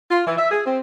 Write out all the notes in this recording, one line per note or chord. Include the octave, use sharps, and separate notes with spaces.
F4
E3
E5
G#4
C4